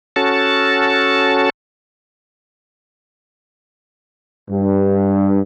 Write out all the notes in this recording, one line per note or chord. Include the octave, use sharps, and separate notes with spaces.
C#4 F#4 A4 A5
G2